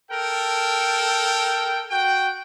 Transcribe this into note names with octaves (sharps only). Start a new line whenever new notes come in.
A4 A#4 G5
F#4 G5